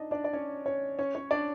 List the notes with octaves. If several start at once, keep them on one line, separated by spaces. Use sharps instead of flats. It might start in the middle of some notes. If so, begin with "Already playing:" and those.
Already playing: D4 D#4 D#5
D4 D5
D5
C#4 C#5
C#4 C#5
C#4 C#5
C#4 C#5
D4 D5